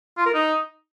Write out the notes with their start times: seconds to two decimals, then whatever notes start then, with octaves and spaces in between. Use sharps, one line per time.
0.18 F4
0.26 A#4
0.34 D#4